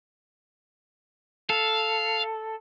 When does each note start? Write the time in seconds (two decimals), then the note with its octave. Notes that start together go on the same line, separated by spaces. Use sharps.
1.50 A4 F5